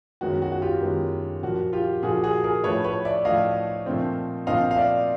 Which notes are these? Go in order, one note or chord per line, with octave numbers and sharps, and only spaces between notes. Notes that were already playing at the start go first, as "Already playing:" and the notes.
F#2 D#3 G#3 B3 F#4
F#4
F#4
F4 G4
F#2 D#3 G#3 B3
A#2 F3 A#3 F#4
F4 G4
A#2 F3 A#3 F#4 G#4
F#4 G#4
G#4 A#4
A2 F3 A3 B4 C#5
B4 C#5
D5 E5
A2 F3 A3 D#5 F5
A#2 F3 A3 C4
A#2 F3 A3 C4 D#5 F5
F5
D5 E5